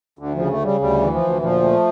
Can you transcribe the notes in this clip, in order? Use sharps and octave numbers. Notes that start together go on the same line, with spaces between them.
D2 D3
C#3 F3
A3
C#3 G3
D2 G3
E3
F3
D2
A#2 F3
A3